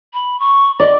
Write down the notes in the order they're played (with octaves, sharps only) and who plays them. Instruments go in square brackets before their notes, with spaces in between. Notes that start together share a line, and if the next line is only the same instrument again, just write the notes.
[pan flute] B5
C#6
[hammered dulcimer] D5 [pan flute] D#5